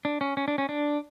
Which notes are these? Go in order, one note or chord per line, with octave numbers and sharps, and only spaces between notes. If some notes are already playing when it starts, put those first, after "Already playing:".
D4
C#4
C#4
D4
C#4
D4